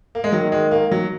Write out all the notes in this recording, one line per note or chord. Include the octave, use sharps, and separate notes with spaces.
A#3
G#3
D#3 F#3
G#3
A#3
F#3